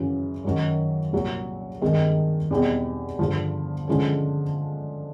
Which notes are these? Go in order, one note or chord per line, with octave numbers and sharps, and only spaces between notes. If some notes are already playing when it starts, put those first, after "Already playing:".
Already playing: F#2 C#3 E3
F#2 D#3 F#3
C2 A#2 F#3
G2 D#3 G#3 C4
E2 B2 G3 C4 D#4
G2 D3 F3
D3 F3 G#3 C#4